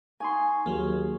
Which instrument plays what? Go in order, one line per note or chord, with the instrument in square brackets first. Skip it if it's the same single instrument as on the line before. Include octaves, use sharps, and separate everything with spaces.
[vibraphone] D#4 C#6 [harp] G#5 C6
[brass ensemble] D#2 [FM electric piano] F#3 A#3 [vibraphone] G#4